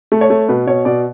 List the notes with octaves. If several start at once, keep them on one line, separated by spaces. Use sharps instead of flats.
A3
C#5
A3
B2 B4
B2 C#5
B2 D5